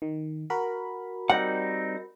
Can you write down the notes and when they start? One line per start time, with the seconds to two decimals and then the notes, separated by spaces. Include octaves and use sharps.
0.02 D#3
0.50 F#4 A#4 B5
1.30 G3 C4 D#4 F#5